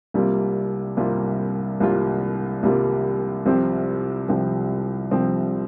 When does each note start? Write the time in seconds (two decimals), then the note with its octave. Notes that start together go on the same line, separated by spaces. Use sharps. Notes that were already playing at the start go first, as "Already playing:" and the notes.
0.14 C2 C3 G3 A#3 F4
0.97 C2 C3 G3 A#3 F4
1.80 C2 C3 G3 A#3 F4
2.63 C2 C3 G3 A#3 F4
3.46 C2 C3 F3 C4
4.29 C2 C3 F3 C4
5.11 C2 C3 F3 C4